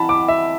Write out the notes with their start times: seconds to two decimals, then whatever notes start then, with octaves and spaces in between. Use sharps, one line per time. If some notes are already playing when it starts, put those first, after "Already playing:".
Already playing: E3 A5 B5
0.09 D6
0.28 E5